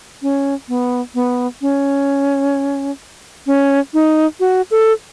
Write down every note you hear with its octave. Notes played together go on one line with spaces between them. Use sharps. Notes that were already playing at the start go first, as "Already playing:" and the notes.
C#4
B3
B3
C#4
C#4
D#4
F#4
A4